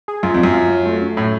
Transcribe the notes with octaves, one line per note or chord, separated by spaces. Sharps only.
G#4
F#2 F4
F2
F#2 F#3
F4
F#3
A3
C#4
A2 C#4